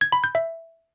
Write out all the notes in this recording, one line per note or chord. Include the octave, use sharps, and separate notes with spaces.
G#6
B5
G6
E5